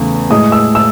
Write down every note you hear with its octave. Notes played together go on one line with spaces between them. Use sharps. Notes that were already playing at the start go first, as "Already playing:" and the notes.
Already playing: E2 C#3 A3
A2 G#3 D#6
E6
E6